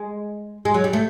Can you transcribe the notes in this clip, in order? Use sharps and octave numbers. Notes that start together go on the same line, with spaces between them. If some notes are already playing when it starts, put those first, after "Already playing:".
Already playing: G#3
G#3
F#3
G3
A3